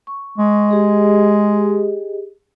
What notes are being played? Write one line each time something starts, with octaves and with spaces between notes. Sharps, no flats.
C#6
G#3
G4 G#4 D#5